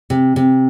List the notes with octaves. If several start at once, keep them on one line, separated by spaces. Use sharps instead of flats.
C3
C3